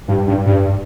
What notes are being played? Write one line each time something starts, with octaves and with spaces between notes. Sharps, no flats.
G2
G2
G2